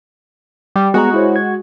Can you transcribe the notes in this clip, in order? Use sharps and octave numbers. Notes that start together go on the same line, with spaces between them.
G3
G#3 B3 F#4 G#4 A#5
E4 C5 C#5
G#6